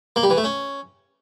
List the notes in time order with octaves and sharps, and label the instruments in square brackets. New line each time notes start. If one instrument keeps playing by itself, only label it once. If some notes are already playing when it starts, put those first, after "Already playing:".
[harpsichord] A#3
G3
E3
A3
C#4